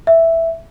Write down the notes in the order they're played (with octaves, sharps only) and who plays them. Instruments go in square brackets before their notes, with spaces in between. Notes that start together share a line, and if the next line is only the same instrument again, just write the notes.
[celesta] E5